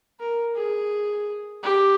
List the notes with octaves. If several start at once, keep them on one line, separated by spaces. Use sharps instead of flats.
A#4
G#4
G4